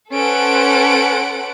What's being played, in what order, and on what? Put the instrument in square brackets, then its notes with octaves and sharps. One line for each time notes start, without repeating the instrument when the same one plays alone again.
[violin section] C#4 A4 B4 C5 F#5 D7